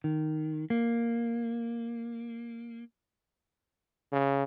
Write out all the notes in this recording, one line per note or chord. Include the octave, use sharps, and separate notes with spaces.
D#3
A#3
C#3